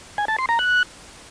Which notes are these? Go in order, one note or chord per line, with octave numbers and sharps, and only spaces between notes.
G#5
A5
C6
A#5
F#6